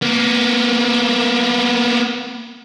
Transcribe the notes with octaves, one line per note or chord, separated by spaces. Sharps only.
A#3 B3